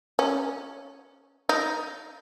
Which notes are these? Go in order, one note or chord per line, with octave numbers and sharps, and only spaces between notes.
C#4
D#4